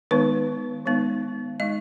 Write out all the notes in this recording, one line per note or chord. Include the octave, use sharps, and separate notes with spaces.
D#3 G#3 B3 D#4 B4
D#3 G#3 B3 D#4
G#3 D#4 D#5